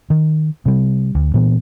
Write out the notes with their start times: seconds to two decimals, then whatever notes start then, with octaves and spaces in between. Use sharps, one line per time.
0.10 D#3
0.66 C3 G3
1.15 D2
1.34 A#2 E3 B3